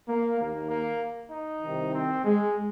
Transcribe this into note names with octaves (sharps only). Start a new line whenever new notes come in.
A#3
D#2 D#3 A#3
A#3
D#4
C2 C3 D#3
C4
G#3